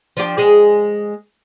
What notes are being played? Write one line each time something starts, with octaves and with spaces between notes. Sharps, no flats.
F3 D4 G4
G#3 G#4